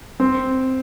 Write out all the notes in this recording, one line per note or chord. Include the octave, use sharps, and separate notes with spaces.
C4